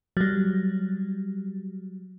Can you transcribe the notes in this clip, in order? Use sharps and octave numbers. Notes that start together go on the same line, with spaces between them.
F#3 G3